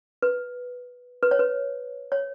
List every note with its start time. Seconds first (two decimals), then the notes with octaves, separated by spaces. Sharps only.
0.22 B4
1.23 B4
1.31 C#5
1.39 B4
2.12 C#5